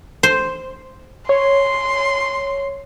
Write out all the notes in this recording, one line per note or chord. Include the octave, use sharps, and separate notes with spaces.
C5
C#5 C6